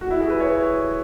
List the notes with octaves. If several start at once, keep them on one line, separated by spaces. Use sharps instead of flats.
F#4
E4
G#4
B4
C#5